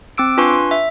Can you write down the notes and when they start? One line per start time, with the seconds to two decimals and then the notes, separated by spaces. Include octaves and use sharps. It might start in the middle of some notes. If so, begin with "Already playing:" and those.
0.18 C4 D6 E6 D7
0.37 D4 F4 B4 G#5 C6 C#6
0.71 E5